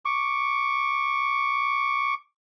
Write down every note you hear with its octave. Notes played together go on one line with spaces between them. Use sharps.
C#6 D6